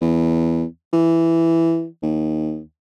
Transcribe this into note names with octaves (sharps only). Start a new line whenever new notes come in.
E2
E3
D#2